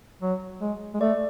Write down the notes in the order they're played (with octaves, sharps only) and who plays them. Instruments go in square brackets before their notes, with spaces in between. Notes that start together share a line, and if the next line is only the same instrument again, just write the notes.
[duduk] F#3
G#3
G#3
[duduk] A3 [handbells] D5